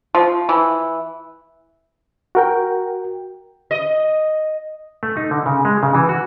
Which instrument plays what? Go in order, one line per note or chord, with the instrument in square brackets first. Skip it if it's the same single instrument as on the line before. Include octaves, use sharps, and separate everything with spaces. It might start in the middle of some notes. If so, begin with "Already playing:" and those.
[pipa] F3
E3
[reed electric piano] F#4 A#4 G5
[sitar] D#5
[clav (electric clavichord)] A3
D#4
D3
C#3
G#3
C#3
E3
F#4